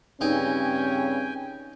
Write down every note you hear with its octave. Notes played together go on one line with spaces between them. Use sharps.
G2 C#3 C4 C#4 D#4 G5 G#5